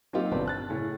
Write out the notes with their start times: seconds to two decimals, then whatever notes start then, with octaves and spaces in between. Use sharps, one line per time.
0.13 F#3 A#3 C4 D#4 F4 G4
0.31 G1 B2 C4 B4 D5
0.46 A5 F#6 A6
0.69 A2 C#3 C#4